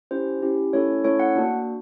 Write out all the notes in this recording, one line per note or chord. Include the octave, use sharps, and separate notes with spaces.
C#4 E4 G4 C5
C#4 E4 G4
A3 C#4 E4 A4 C#5
A3 C#4 E4 A4 C#5
F#5
A#3 D4 F#4